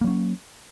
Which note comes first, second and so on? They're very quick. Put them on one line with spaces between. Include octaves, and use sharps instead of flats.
A#3 F#3 C#4